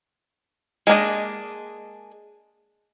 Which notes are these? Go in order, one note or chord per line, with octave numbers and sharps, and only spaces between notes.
G#3 A#3 D4 D#5